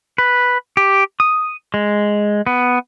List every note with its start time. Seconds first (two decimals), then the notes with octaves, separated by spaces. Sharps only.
0.18 B4
0.77 G4
1.20 D#6
1.74 G#3
2.47 B3